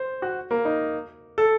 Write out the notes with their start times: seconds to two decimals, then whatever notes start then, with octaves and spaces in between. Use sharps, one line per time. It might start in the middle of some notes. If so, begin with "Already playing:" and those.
Already playing: C5
0.22 F#4
0.51 A#3
0.65 D#4
1.38 A4